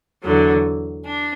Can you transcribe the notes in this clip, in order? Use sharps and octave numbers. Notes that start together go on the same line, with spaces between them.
E2 D3 F#3
D4